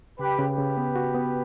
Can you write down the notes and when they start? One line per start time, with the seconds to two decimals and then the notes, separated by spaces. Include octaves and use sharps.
0.19 C#3 G4 B4
0.38 C#3
0.49 G4 B4
0.58 C#3
0.77 B3
0.96 F#4
1.15 B3